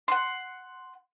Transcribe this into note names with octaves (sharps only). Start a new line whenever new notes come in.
F#5 C6